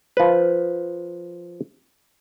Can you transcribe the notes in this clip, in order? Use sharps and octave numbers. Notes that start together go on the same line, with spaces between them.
F3 B4